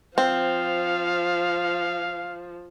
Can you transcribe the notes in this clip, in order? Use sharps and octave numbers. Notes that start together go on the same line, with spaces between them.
F3 C4 F5